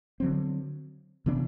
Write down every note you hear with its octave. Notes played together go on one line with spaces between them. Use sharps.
D3 F#3 C4
C3 E3 B3 D4